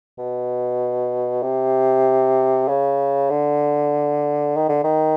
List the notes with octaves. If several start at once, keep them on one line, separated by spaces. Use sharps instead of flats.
B2
C3
C#3
D3
D#3
D3
D#3